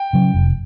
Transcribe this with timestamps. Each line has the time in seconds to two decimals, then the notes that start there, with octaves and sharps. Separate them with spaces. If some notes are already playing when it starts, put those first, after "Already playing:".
Already playing: G5
0.13 C#3 F#3
0.34 F1